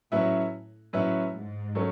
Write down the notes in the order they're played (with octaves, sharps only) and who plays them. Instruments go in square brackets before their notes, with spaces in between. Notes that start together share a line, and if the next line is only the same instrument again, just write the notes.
[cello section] A2 [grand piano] F#3 C#4 E4 B4 E5
[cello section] A2 [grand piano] F#3 C#4 E4 B4 E5
[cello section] G#2
[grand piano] F#3 A3 C#4